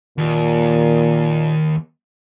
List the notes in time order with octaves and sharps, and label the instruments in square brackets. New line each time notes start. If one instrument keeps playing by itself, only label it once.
[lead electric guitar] D#2 [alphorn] A#2